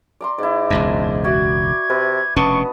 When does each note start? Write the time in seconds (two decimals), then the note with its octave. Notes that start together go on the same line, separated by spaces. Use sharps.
0.21 D5 A#5 C6
0.38 G#2 E4 D5
0.70 E1 C#2 F#2 A5 A#5
1.24 F#4 D5 E5 G#6
1.90 C3 B4
2.36 F1 B2 B3 C#4 D4 D#5 A5 C#6